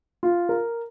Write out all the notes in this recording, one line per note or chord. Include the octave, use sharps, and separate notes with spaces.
F4
A#4